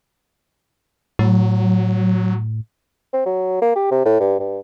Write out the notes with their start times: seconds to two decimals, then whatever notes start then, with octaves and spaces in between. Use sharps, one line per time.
1.19 A2 F#3
3.13 C4
3.26 F#3
3.62 A#3
3.76 G4
3.91 C3
4.05 A2
4.20 G2
4.40 G2